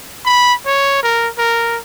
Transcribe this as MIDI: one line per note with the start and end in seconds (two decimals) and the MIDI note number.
0.25 0.54 83
0.66 1.02 73
1.03 1.28 70
1.38 1.79 70